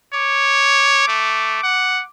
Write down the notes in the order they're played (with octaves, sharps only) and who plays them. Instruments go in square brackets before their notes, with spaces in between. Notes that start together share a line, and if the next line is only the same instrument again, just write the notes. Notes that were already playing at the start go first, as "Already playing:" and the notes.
[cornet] C#5 [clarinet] D6
[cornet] A3
F#5